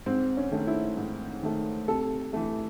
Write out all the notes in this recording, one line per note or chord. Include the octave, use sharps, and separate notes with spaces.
G#2 C4
C#4
D#3 A3
E4
G#2
D#3 A3
C3 A4
E3 A3